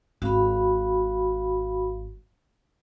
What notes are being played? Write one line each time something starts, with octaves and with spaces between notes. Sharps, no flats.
G#1 F#4 F5 B5